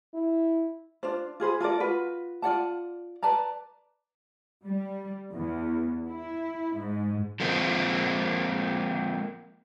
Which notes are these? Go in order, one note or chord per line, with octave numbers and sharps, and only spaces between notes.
E4
D4 F4 C5
F4 G#4 C5 B5
F4 A4 A#4 D5
F4 F#4 B4
F4 D5 F#5 A5
B4 D5 A5 A#5
G3
E2
E4
G#2
F3 G#3 A#3 C4